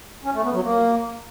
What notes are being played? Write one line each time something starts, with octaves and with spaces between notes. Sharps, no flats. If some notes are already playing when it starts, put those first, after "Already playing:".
C#4
A3
B3
F#3
A#3